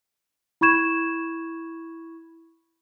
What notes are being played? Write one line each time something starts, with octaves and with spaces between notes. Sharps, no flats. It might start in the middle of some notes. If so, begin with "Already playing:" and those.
E4 B5 C#6 G#6 E7